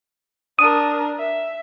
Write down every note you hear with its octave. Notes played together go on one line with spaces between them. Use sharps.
D4 A#4 D#6
E5